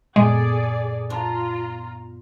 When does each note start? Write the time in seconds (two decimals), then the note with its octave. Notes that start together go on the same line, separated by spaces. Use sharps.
0.16 F#2 A#2 G#3 B3 G#4 A4 D5
1.10 D4 F4 A#5